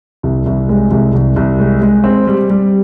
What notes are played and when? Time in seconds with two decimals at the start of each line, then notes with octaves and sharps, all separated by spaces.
0.23 C2
0.46 C2
0.69 G#3
0.91 C2
1.14 C2
1.36 C2
1.59 G#3
1.82 G#3
2.04 C4
2.27 G3
2.50 G3